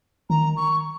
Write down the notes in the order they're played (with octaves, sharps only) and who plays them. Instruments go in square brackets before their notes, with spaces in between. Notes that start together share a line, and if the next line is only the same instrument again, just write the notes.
[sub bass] D#3 [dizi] A#5
[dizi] C#6